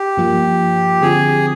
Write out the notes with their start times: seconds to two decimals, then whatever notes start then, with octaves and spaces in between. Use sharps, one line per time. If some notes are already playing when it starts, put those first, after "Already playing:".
Already playing: G4
0.17 G2 F3 A#3 F4
1.02 D3 F3 C4 F4 G#4